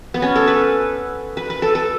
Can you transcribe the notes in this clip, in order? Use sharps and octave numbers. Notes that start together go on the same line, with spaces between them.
B3
C#4
A4
B4
B4
B4
A4
A4